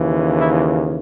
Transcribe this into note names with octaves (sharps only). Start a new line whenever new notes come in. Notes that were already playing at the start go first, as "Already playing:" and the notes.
Already playing: D#2 C#3 E3
E4